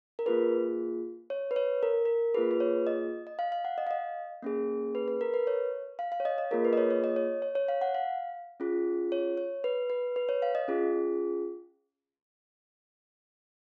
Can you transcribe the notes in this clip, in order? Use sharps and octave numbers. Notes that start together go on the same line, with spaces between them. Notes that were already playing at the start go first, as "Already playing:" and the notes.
A#4
A#3 F4 G#4 B4
C#5
B4
C#5
A#4
A#4
A#3 F4 G#4 B4
B4
C#5
D#5
D#5
F5
F5
F#5
D#5
F5
D#5
A#3 C#4 G#4
B4
B4
A#4
B4
C#5
F5
F5
C#5
D#5
D#5
A#3 F4 G#4 A#4
B4
D#5
C#5
C#5
D#5
C#5
C#5
C#5
F5
F#5
F5
C#4 F4 G#4
C#5
C#5
B4
B4
B4
C#5
F5
D#5
C#4 F4 G#4